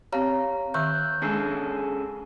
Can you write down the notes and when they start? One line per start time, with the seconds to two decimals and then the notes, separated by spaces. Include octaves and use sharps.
0.12 C4 G4 C#5 F5 A#5
0.74 D#3 E5 E6 F#6 G6
1.22 G#3 C#4 D4 G#4 A4 G#5